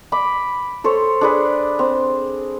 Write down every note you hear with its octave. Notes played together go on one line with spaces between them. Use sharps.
B5 D6
A4 C5 C#5
D4 G#4 B4
C4